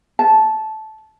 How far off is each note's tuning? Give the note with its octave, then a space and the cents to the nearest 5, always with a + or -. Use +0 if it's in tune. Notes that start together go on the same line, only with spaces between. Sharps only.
A5 -15